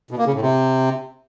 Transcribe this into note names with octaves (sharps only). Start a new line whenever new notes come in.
B2
A#3
C#3
A2
C3